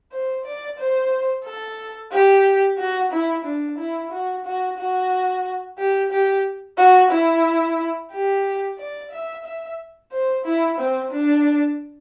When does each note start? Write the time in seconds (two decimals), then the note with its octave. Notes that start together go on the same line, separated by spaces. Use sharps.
0.11 C5
0.44 D5
0.78 C5
1.45 A4
2.12 G4
2.77 F#4
3.12 E4
3.45 D4
3.78 E4
4.11 F#4
4.45 F#4
4.78 F#4
5.78 G4
6.11 G4
6.77 F#4
7.11 E4
8.12 G4
8.78 D5
9.11 E5
9.44 E5
10.12 C5
10.44 E4
10.78 C4
11.11 D4